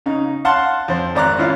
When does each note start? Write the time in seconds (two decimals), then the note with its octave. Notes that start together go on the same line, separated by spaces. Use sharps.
0.06 C#3 D#4
0.45 F5 F#5 A5 C6
0.88 F2 C5
1.15 G#1 D5 A#5 F#6
1.38 G#1 C#4 E4 F4 F5